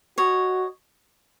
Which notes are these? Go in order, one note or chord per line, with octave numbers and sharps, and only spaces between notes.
F#4 C#5 D#5